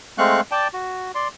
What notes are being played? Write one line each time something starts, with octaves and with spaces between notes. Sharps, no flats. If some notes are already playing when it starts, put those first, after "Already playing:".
G#3 A3 C4 F5 C#6 F#6
D5 G5 A5
F#4
D5 C6